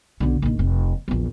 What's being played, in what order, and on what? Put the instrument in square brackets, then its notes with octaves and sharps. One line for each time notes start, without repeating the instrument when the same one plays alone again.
[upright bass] B1 D3
A#1 D#3
F1
A#1 E2